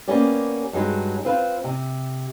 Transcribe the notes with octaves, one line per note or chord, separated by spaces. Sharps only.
A#3 B3 C#4 G4 D5
G2 F#3 G#3 D#4
C4 F4 B4 F5
C3